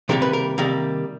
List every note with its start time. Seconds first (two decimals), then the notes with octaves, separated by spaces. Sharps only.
0.09 C3 D#3 G3 A#3 A#4
0.22 B4
0.33 A#4
0.58 C3 D#3 G3 A#3